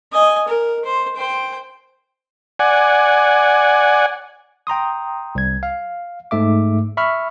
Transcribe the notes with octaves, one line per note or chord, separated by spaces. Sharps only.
D#5 G#5
A#4
C5
C5 G5
D5 F#5 G#5
G5 A#5 C6 D#6
C2 G#6
F5
G#2 A3 E5 D6
E5 B5 C#6 F6